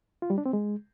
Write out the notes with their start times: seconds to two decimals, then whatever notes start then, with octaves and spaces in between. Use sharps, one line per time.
0.22 F4
0.30 G3
0.38 D4
0.46 C4
0.53 G#3